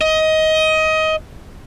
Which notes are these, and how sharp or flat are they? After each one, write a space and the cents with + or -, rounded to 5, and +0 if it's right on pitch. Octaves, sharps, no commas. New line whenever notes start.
D#5 +20